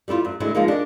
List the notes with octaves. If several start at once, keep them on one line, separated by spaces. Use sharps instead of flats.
G3 A3 E4 F4
F#2
D3 F#3 G#3 A3 D4 E4
F3 G#3 A#3 D#4
D4 A#4